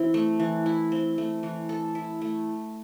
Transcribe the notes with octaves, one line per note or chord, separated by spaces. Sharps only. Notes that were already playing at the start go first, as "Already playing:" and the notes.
Already playing: E3 C4 E4
A3
E3
E4
C4
A3
E3
A4
E4
A3